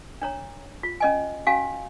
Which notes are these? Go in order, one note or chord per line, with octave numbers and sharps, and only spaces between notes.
D4 C#5 A#5
F4
C#4 D#5 G#5
C#4 F#4 F5 G#5